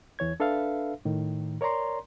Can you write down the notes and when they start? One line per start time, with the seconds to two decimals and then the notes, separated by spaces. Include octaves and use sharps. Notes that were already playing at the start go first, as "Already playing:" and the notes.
0.19 E2 E3 C#5 G#6
0.40 D4 A4 B4 E5 F5
1.05 A2 D#3
1.61 A#4 C#5 D5 A#5 C6